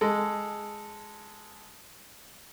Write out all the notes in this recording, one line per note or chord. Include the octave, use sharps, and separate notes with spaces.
G#3 A4